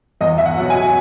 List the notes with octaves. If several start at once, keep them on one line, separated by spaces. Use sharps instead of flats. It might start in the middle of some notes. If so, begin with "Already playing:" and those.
E2 D#5
E5
F#5
B2 F#3
G#5